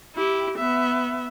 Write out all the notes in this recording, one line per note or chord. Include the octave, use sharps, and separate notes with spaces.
E4 G4
B3 E5